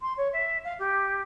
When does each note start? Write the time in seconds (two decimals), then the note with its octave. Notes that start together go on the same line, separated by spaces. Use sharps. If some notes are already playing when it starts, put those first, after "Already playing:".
0.01 C6
0.17 C#5
0.33 E5
0.64 F5
0.79 G4